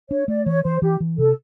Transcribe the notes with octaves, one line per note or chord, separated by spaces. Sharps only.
D4 C#5
A3 D5
E3 C#5
E3 C5
E3 G4
E3
C3 A4